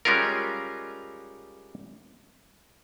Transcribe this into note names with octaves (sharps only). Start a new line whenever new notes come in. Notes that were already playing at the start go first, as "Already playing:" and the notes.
G3 G#3 C#4 F4 A#4